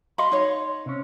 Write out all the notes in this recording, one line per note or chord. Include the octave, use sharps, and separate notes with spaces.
D#5 F5 B5 C6
D#4 C#5
C3 C#4